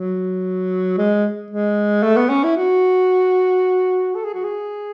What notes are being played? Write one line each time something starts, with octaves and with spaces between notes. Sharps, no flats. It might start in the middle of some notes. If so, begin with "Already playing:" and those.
Already playing: F#3
G#3
G#3
A3
B3
C#4
E4
F#4
A4
G#4
F#4
G#4